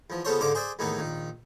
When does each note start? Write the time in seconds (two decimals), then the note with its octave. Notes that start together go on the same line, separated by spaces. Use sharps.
0.10 E2 F3
0.25 C#3 B3 F4 A4 C5 C#5
0.40 G#2 D3 C5 F5 D6
0.55 G#4 C5 D5 E5
0.79 E2 A2 D#3 E3 A#3 B3
0.99 A#1 D#3